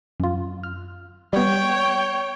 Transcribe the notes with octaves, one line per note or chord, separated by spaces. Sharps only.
F#2 F4
F6
G3 B3 C#5 G5